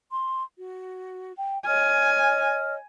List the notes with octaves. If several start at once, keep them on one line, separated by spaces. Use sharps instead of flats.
C6
F#4
G5
C#5 D#5 G#5 F6